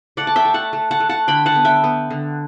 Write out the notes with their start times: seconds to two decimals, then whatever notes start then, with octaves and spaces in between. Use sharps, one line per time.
0.17 A3 D5 F#5
0.27 A5
0.36 E5 G5
0.45 A3
0.54 F#5 A5
0.73 A3
0.91 F#5 A5
1.00 A3
1.09 F#5 A5
1.28 D3 G5 B5
1.46 F#5 A5
1.55 B3
1.65 E5 G5
1.84 B3
2.10 D3